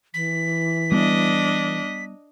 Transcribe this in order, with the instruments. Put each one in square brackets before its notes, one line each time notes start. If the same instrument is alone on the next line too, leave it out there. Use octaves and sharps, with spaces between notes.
[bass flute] E3 [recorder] B6
[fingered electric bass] G3 B3 [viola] D4 D#5